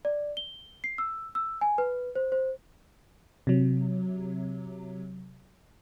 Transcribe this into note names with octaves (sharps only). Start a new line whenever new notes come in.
D5
G7
C7
E6
E6
G#5
B4
C5
C5
C3 F#3